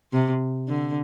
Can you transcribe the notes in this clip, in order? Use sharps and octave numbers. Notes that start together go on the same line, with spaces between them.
C3
D3